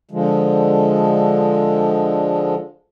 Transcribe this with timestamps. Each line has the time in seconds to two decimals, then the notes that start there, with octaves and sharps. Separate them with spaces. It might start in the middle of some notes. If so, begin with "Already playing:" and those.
0.11 D3 F3 G#3